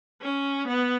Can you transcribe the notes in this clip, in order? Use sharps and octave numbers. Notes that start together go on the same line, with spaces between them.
C#4
B3